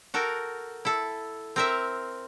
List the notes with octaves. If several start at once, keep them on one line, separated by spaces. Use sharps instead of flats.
F#4 A4 A#4 G5
E4 A4
C4 A#4 E5